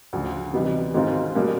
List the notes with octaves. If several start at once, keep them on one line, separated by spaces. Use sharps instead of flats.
D2 C#3 F3
C3 E3 G3 B3 D#4
G#2 D#3 G#3 C4 F4
B2 G3 A#3 C#4